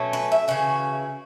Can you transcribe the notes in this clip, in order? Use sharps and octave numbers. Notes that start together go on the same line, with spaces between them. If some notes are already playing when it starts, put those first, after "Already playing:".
Already playing: B2 F#3 A3 C#4
B4
E5
C#3 E3 C#4 F#4